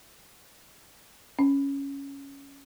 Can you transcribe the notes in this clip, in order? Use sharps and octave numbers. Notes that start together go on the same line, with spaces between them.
C#4